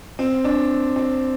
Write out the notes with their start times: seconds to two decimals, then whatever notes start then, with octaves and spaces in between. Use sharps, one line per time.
0.19 C4
0.44 D4
0.96 C4